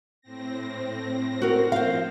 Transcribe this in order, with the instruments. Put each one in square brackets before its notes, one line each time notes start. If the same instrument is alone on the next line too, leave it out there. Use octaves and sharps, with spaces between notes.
[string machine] A2 C4 A#6
[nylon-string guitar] F#4 A#4
[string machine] F3 [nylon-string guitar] C5 F5